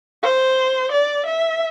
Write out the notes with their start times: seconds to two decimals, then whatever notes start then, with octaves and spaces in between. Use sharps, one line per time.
0.23 C5
0.92 D5
1.27 E5